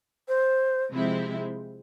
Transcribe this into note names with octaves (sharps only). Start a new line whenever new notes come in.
C5
C3 F3 G#3 C4 E4